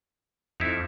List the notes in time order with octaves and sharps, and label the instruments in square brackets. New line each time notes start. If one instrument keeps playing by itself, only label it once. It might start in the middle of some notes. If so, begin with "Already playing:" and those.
[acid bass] F2 [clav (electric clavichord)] D#4 E4